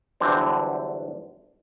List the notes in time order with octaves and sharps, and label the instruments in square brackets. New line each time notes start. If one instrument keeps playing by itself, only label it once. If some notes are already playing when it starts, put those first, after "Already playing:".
[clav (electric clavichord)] G1 E2 D3 F#3 C4